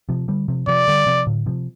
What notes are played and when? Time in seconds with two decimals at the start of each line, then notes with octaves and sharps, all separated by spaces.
0.09 C3 F3
0.28 D3 G3
0.48 C3 F3
0.67 C3 F3 D5
0.88 D3 G3
1.06 C3 F3
1.27 A2 D3
1.46 C3 F3